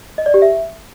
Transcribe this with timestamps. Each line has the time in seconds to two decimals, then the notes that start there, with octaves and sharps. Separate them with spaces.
0.18 D#5
0.26 D5
0.34 G4
0.42 E5